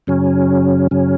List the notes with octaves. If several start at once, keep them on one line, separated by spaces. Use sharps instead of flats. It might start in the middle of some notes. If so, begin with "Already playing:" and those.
F#2 C#3 F#3 C#4
F#2 C#3 F#3 C#4